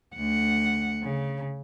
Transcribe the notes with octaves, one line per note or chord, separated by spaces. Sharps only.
D2 F#5
C#3